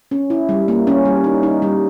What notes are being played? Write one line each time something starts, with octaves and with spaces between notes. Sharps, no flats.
C#4
E4
G3
A#3
C#4
G3
D#4
D#4
G3